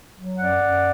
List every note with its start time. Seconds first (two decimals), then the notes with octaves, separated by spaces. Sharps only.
0.16 F#3
0.37 F#2 D5 F#5
0.59 F#2